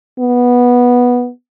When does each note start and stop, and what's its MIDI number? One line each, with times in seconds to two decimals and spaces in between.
0.20 1.30 59